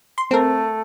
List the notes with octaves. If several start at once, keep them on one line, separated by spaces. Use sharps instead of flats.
C6
A3 C4 A#4